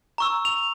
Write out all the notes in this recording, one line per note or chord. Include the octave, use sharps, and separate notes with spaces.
A#5 C#6 E6
F7